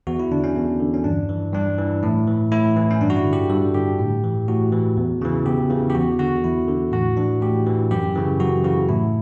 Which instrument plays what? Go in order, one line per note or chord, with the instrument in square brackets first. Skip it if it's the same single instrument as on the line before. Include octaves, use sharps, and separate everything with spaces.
[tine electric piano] E2 F#4
E4
D3 D4
C#4
E2
D3
C#4
G2 D4
E3
G2 D4
E3
A2 E4
E3
A2 E4
E3
C#4
G2 D4
F#4
E4
D3
G4
G2 A4
D3 G4
A2
E3
A2 F#4
E3
E2
C#3 E3
E2 G4
C#3 E3
G4
E2 F#4
D3 F#4
E2 E4
D3
A2 F#4
E3 D4
A2 G4
E3
F#2 G4
C#3 E3
F#2 F#4
C#3 E3 F#4
A2 E4